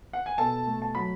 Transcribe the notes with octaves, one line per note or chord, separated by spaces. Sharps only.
F#5
G#5
B2 A4 A5
A3
A5
F#3 B5